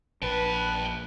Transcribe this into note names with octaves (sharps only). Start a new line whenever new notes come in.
A#1 B4 G5 A5